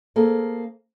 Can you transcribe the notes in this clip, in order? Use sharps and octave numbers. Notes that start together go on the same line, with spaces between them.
A#3 C4 G#4 A4